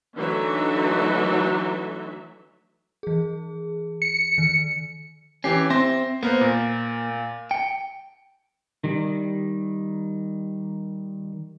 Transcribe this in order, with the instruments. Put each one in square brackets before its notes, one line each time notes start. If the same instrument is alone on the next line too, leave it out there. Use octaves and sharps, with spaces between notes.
[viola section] D3 E3 F#3 A3 D#4 E5
[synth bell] E3 G#4
[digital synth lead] C#7
[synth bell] D#3
[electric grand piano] E3 G4 C7 [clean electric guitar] C#4
[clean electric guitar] C4 [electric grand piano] E5 C6 A#6
[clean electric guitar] A#3 [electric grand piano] B3 A#4 C5
[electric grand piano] A#2
[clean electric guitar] G5 [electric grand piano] C#7
[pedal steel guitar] D#3 G3